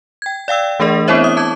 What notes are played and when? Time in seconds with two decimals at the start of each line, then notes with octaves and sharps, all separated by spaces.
0.22 G5 G#6
0.48 D5 F5 G5 E6
0.80 E3 A3 D4 G#4 A#4 D#5
1.08 B3 C4 E4 C5 C#5 E5
1.24 D#6
1.37 A5 D6 G#6